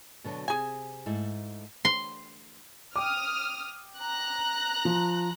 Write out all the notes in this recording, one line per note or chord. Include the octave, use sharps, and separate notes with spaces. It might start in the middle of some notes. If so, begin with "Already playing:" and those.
B2 D3 F#3
C3 G#4 G#5
G#2 A3 E4
C6
G5 D6 D#6 F6
A#5 F#6 A#6
F3